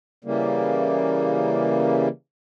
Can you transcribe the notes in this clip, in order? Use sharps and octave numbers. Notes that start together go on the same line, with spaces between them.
C#3 E3 G3 A#3